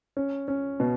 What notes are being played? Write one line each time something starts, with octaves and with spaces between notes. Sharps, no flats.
C#4
C#4
B2